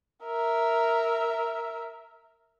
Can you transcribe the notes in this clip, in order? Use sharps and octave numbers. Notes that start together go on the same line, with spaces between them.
A#4 E5